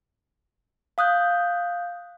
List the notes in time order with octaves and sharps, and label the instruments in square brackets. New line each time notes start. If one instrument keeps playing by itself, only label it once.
[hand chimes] F5 D#6 F#6 G6